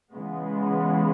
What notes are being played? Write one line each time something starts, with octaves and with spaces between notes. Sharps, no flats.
C#3 E3 G#3 B3